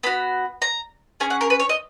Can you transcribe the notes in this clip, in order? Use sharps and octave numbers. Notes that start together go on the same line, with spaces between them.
B3 F#4 B5
A#5
C#4 G#4 G#5
F#5
A#4
B4
C#5
D#5